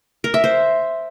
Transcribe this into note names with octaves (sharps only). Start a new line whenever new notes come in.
A#4
E5
C5